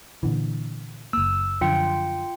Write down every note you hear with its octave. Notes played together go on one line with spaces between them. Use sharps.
A#2 D3 E3
F#1 A#3 E6
F#2 D3 F3 F4 G5 C#7